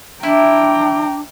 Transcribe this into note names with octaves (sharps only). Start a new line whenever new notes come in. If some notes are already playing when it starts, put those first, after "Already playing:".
D4 E4 G5 A#5